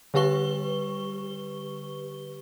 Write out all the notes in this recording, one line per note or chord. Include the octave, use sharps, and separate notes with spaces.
D3 G3 G4 B4 C#6 G7